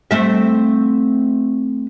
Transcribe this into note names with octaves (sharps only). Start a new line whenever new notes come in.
A3 C4 E5